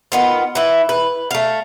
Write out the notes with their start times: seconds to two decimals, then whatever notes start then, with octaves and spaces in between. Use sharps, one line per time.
0.12 D#3 B3 F4
0.55 E3 E4
0.89 B4
1.31 A3 F5